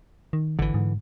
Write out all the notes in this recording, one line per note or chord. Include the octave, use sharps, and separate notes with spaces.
D#3
G#1 D3 E3
G#2